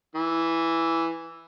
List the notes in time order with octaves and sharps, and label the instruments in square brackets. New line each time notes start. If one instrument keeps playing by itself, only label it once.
[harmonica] E3